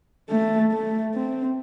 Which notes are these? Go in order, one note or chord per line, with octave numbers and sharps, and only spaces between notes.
A3
A3
C4